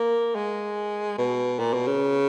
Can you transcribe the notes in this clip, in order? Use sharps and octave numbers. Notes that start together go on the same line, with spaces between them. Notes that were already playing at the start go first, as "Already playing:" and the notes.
Already playing: A#3
G#3
B2
A#2
B2
C#3